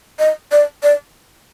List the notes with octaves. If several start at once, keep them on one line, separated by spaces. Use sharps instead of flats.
D#5
D5
D5